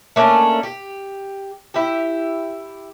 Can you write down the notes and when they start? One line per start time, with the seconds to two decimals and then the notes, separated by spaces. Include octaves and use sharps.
0.16 A3 A#3 C#4 D4
0.63 G4
1.74 E4 G4